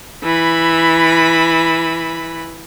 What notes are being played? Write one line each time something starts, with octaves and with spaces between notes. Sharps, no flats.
E3 B5